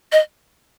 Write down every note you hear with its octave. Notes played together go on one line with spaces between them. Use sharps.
D#5